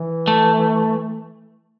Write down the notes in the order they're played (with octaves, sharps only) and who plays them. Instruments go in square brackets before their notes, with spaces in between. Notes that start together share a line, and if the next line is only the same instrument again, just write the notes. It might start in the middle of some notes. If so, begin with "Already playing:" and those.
Already playing: [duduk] E3
[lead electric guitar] A3